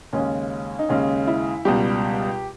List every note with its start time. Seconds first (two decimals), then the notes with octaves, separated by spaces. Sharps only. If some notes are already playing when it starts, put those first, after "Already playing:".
0.13 D#2 C#3 G#3 C#4
0.79 D#4
0.89 D#2 C#3 G#3 C#4
1.27 E4
1.65 C#2 B2 G3 G4